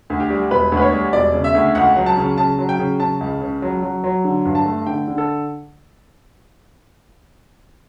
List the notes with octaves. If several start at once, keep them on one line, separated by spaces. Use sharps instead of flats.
D2
G4
G3
E1 B4
D2
B4
C#5
G3
E1 D5
C#3
E5
D2
C#2 F#5
F#3
A5
C#3
C#3 A5
F#3
G5
C#3
C#3 A5
C#2
C#3
F#3
F#3
F#3
D3
G2
A5
A3
D3 G5
D3
A4